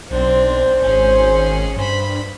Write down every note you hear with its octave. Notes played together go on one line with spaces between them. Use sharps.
B1 C4 D4 C5
G#1 C#4 G#4
G2 C5 B5